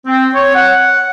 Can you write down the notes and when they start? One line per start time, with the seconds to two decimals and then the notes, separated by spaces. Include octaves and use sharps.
0.06 C4
0.35 C#5
0.55 F#5